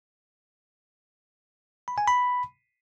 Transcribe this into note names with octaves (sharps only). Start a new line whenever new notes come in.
B5
G#5
B5